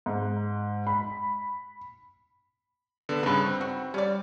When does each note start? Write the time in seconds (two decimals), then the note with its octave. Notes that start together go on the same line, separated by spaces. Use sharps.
0.06 G#2
0.87 B5
3.09 D3 B3
3.23 G2 C#3 D#4 B4
3.46 C4
3.61 F#4
3.94 G3 C#4 D5